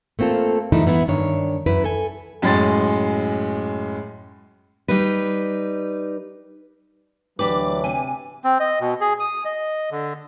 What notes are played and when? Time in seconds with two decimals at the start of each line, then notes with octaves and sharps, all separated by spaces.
0.19 A3 A#3 C4 F4 A4
0.72 E3 F3 G3 A3 D#4 E4
0.86 G#2 E3 B3 E4
1.08 G2 D#3 D4 C#5
1.66 F#2 E4 B4
1.84 A4 G#5
2.42 F#2 A2 G#3 C6 A6
4.88 G3 D#4 B4
7.39 D2 E3 F#3 D4 G4 B4 D6
7.84 C3 G#5
8.44 C4
8.60 D#5
8.80 B2
9.01 G#4
9.20 D#6
9.45 D#5
9.91 D3